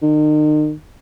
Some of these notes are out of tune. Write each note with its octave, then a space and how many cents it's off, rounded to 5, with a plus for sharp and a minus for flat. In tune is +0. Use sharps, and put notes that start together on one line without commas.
D#3 -40